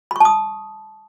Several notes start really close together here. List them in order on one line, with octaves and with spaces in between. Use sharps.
B5 C#6 A5 D#6